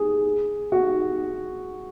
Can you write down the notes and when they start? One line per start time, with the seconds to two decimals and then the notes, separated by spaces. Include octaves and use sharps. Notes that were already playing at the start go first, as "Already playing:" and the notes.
Already playing: G#4
0.72 F#4